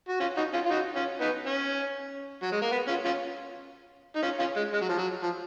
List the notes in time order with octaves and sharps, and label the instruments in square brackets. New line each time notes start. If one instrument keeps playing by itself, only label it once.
[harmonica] F#4
C#4 F4
D#4 F#4
C#4 F4
F4
D#4 F#4
C#4 F4
B3 D#4
C#4
F#3
G#3
A#3
B3
C#4 F4
C#4 F4
D#4
C#4 F4
C#4 F4
G#3
G#3
F#3
F3
F#3
F3